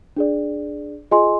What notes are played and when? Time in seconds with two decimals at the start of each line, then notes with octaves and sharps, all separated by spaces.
0.16 D4 G#4 D5
1.11 F4 G#4 D#5 G#5 C6